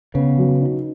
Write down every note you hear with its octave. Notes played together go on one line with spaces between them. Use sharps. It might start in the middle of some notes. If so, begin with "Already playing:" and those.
C#3 B3
F#3
D#4